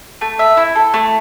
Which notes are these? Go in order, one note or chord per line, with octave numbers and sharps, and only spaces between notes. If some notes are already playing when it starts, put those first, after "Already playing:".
A3
E5
E4
A4
A3